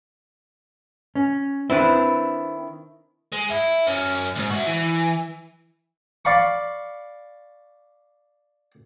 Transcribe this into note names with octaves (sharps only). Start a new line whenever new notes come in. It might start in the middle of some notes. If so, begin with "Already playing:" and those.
C#4
D#3 C4 D4 E4 B4
G#3
E4
F#2 C#4
D#2 G#2
F#4 E5
E3
D5 F5 B5 C#6